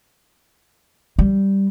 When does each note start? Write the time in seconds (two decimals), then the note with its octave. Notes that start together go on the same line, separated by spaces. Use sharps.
1.19 G3